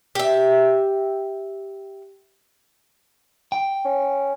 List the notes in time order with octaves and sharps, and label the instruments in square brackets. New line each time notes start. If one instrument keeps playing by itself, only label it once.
[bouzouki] G4 E5
[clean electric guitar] G5
[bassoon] C#4